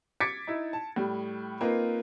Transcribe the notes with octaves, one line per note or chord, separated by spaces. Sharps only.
D6 G#6 A6 B6 C#7 D7
D#4 E4
A5
A2 G3
A#3 C4 D#4 F4 B4